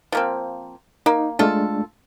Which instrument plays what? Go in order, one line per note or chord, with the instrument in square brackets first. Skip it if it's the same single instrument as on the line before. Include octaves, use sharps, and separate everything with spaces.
[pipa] F3 A#3 C4
[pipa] A#3 [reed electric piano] D#4
[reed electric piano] G#3 A3 D4 [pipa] F4 A4